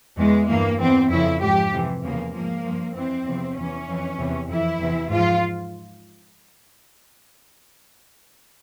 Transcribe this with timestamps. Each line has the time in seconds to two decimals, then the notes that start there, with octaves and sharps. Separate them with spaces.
0.18 E2 E3 G#3
0.48 G2 E3 A#3
0.79 E2 E3 C4
1.10 F2 C#3 E3 E4
1.41 G#2 F3 G4
1.71 F2 C3 E3
2.03 E2 C#3 F3 A#3
2.33 F3 A#3
2.39 G#2
2.64 G2 F3
2.94 F2 E3 C4
3.26 E2 C3 F3
3.57 E2 E3 C#4
3.87 F2 E3
4.18 E2 C3 E3
4.48 F2 E3 E4
4.79 E2 C3 E3
5.10 G#2 F3 F4